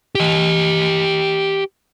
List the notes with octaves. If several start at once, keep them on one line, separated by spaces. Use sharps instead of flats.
G4 D#5